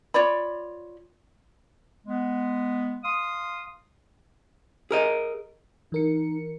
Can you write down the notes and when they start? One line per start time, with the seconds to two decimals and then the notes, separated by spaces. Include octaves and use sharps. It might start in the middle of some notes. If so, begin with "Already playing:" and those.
0.14 F4 C#5 D5 B5
2.06 G#3 B3
3.03 F5 C6 D#6
4.91 G#4 A#4 D#5
5.92 E3 D#4 A#4 C#7